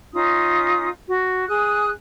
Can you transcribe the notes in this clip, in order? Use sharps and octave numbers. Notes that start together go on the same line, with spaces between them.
C#4 D#4 F4 D#6
F#4
G#4 D#6 F#6